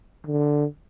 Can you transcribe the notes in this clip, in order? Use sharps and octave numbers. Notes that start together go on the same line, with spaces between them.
D3